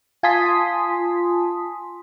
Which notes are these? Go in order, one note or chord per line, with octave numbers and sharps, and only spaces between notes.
F4 G#5 A5 C6 D#6 B6